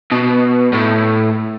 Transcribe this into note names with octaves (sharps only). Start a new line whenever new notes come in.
B2
A2